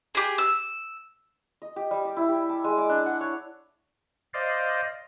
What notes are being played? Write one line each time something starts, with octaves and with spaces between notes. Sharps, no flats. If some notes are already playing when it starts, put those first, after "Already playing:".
G4 G#4
E6
D#5
G4
G3
D5
E4
G4
A5
G#3
D5
D4
F#5
C#5
C5 D5 D#5 F5